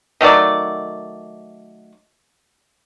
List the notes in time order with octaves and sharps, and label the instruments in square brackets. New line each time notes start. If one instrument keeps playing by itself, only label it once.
[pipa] D#3 F#3 A3 D5